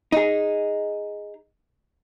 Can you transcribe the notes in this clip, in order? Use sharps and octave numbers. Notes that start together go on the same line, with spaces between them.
D#4 G#4